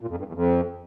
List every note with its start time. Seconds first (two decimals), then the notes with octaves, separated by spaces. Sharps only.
0.01 A#2
0.10 F2
0.18 G2
0.27 E2
0.35 F2